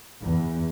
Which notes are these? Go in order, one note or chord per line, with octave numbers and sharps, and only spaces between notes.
E2